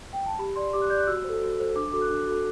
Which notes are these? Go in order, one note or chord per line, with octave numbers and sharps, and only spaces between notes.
G5
A5
G4 B5
D5 C6
G4 D6
F#6
D5 G6
F#6
F#4 E6
A4 C5
F#4
A4 C5
D4 D6
F#4 A4 D6
F#6
D4
F#4 A4